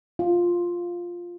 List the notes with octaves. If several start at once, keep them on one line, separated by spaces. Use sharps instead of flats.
F4